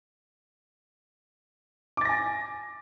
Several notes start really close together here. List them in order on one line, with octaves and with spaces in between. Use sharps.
D6 A6 A#6 G#5